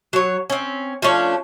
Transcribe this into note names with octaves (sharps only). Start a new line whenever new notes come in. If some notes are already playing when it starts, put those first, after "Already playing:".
F#3 C#5
C4 C#4
F3 A3 C#4 D4